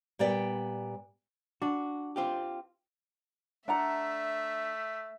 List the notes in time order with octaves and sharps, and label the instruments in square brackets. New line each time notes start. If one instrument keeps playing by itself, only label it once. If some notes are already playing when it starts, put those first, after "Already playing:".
[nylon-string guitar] A#2 G3 B3 D5 G5
[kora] D4 [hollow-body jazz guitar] F#4
[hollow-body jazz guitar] C4 F4 G4
[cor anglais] A3 [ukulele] D4 F#5 A#5 [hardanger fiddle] E5